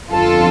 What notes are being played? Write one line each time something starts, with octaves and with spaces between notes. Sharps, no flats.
G1 F2 D3 F4 A4